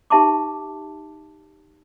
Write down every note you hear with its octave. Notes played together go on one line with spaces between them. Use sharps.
D#4 G4 E5 A5 C6 D6